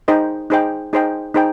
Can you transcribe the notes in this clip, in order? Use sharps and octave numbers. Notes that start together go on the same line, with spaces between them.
D#4 G#4 C5 D#5 G5
D#4 G#4 C5 D#5 G5
D#4 G#4 C5 D#5 G5
D#4 G#4 C5 D#5 G5